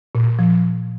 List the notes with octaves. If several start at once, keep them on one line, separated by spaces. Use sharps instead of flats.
A#2
F3